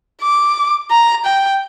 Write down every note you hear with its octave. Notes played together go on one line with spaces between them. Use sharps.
D6
A#5
G5